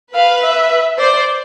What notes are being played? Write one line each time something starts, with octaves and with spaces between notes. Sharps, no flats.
B4 F5
E5
C5 D5